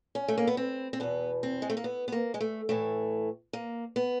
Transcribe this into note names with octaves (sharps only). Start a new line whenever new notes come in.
C#4
A3
A#3
B3
C4
C4
E2 B2 B3
C4
G#3
A3
A#3
B3
B3
A#3
G#3
A3
A2 E3 A3
A#3
B3